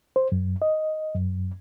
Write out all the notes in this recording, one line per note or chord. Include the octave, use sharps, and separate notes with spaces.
C5
F#2
D#5
F#2